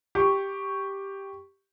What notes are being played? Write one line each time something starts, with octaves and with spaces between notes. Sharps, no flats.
G4 C#6